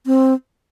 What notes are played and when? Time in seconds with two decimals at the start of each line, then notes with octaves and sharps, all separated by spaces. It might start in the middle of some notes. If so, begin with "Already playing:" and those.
0.06 C4